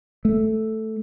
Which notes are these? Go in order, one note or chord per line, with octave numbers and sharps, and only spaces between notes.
A3